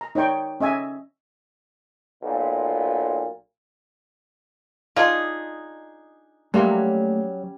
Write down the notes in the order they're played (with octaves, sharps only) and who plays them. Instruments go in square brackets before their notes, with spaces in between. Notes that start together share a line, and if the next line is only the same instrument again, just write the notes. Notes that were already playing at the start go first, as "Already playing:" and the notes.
[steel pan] A#5
D#4 C#5 D5 G5 C#6
C#4 D#5 E5 G#5
[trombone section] B1 A#2
[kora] D4 D#4 [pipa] F4 G#4
[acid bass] F#3 [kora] G3 C#4 [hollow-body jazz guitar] A3 A#3 C6